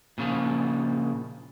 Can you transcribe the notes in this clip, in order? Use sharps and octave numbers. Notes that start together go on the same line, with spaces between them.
A#2 C#3 F3